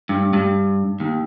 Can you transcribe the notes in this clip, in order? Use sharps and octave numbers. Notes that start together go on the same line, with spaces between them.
G2
G2
D#2